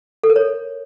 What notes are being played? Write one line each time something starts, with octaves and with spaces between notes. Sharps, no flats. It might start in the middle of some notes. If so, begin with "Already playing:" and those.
A4
A#4
C#5